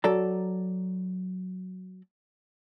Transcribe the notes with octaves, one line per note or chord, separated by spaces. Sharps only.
F#3 A4 D5 A#5